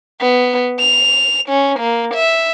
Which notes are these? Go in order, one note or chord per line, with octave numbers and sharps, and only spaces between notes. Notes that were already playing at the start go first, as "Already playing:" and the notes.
B3
F7
C#4
A#3
E5